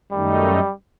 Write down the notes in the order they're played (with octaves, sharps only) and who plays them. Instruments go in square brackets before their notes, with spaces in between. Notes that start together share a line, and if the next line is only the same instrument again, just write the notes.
[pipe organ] F#2 D#3 A3 D#4 [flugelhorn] G3